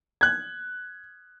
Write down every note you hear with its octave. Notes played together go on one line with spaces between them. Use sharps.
F#6 G#6